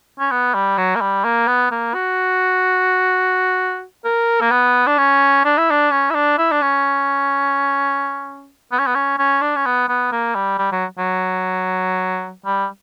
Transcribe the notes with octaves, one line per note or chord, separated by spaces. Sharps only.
C#4
B3
G3
F#3
A#3
G3
A#3
B3
A#3
F#4
A#4
A#3
B3
D4
C#4
D4
E4
D4
C#4
E4
D4
E4
D4
C#4
B3
C#4
B3
C#4
C#4
D4
C#4
B3
B3
A#3
G3
G3
F#3
F#3
G3